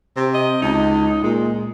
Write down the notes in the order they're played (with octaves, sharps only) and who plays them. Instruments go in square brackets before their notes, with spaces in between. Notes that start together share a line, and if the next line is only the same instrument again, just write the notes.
[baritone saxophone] C3 [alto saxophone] C4
[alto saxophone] D#5
[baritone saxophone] C#2 [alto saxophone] D#4
[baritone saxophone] A#2 [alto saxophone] G#3